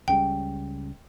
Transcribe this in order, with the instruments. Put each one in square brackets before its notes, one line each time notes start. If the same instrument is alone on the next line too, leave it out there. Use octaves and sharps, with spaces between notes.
[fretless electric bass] C#2 C#3 G3 [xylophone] G5